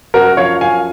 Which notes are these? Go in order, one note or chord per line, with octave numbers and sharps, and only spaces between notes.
F#2 F#4 A#4
F3 C#5 F5
F#2 F5 G#5